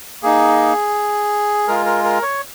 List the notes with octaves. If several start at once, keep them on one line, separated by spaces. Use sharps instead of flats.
A#3 D#4 G#4
G#3 F4 A#4
A#4
A#4
C#5